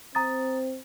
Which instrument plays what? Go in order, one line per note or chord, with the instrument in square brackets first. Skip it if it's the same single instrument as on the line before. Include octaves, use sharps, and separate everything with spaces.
[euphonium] C4 [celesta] A#5 D#6 A6